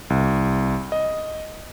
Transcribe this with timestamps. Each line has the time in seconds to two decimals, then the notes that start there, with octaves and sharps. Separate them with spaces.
0.10 C2
0.92 D#5